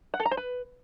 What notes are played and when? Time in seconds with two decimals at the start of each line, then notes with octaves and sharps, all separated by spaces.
0.14 F#5
0.20 A4
0.26 A#5
0.31 C5
0.37 B4